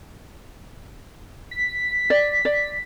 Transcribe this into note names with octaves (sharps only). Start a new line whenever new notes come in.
B6
D5
D5